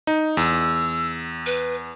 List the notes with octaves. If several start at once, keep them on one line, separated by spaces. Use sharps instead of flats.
D#4
E2 E6
B4